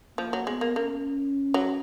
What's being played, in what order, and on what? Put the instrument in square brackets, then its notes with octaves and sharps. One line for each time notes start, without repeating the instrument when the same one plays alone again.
[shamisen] F3 [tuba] A#3
[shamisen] F#3
[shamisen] G#3 [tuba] B3
[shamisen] A#3
[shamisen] A#3 [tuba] C#4
[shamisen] F#3